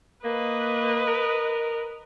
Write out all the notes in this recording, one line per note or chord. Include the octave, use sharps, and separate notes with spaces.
A#3 B4 D#5
A#4